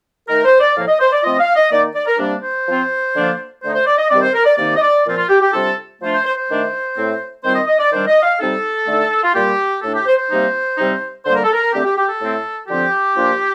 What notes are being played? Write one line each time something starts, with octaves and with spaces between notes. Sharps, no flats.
D#3 A3 D#4 A#4
C5
D5
A2 F3 A#3 F5
D#5
C5
D5
F3 A3 C4 F4 D#5
F5
D#5
D#3 A#3 D#4 D5
D5
A#4
C3 G3 A#3 D4
C5
F3 C4 F4
D3 F3 A#3 D4 F4
D3 A3 D#4 C5
C5
D5
D#5
C3 D#3 G3 C4 D5
C5
A#4
D5
C3 D#3 A#3 D#4 D5
D#5
D5
A#2 F3 C4 F4
F4
G4
G4
C3 G3 D4 F4 A4
F3 A3 D4 F4 C5
C5
C5
C5
D#3 A3 D4
A2 A3 C4
D#3 G3 C4 F4 C5
D#5
D#5
D5
D#3 G3 D4 C5
D#5
F5
C3 G3 C4 D#4 A4
D3 A3 D#4
F4
A#2 G3 A#3 F4 G4
A2 A3 D4 A4
G4
C5
C5
C3 G3 A#3 D#4
C3 G3 C4 D#4
D3 G3 A#3 C5
A#4
A4
A#4
D3 A3 C4 G4
G4
G4
A4
A2 A3 C4
D3 F3 C4 F4 G4
A#2 F3 A#3 D4 F4